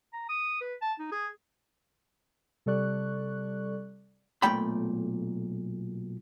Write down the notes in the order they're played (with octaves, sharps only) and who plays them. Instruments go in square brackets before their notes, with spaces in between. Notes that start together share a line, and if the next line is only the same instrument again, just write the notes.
[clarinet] A#5
D#6
B4
A5
D#4
G#4
[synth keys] C3 G3 A4 D5 C#6 F#6
[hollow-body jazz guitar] B1 A#2 A3 G5 B5